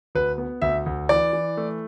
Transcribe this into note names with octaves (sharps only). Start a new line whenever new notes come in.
D2 B4
B3
D2 E5
D2
E3 D5
E3
A3